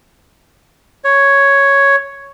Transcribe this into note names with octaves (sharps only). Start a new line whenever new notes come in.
C#5